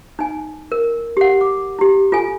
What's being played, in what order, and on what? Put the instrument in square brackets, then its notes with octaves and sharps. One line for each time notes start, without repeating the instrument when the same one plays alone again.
[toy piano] D#4 G#5
A#4
G4 F#5
D6
E4 G4
F4 A4 G#5